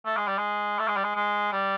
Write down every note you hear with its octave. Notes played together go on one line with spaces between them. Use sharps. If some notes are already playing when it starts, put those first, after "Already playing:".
A3
G#3
G3
G#3
A3
G#3
G3
G#3
G#3
G3